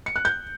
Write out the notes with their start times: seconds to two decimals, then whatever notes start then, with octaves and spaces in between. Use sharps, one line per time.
0.06 C#7
0.16 F#6
0.25 G6